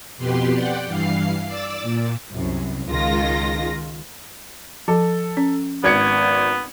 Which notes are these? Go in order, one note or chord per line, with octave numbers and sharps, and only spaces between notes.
F2 B2 G4 B4 C6
D5 F#5 G5
G2 E3 F5 C7
D5 D6 E6 A6
A#2
C2 F#2
C#2 D#3 G#3 F4 A#6
F3 A4
C#4
G#1 B3 G#6 C#7